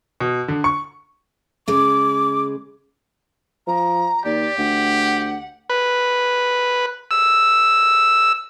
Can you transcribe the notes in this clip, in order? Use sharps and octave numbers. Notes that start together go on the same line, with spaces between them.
B2
D3
C#6
C#3 G#3 D6
F3 A#5
D#2 G4 D5
D2 F#5
B4
E6